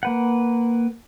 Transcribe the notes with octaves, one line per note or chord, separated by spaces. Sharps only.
A#3 B4 F#5